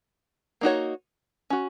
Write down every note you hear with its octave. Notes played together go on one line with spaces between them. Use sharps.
A#3 D#4 F#4 C#5
C#4 F#4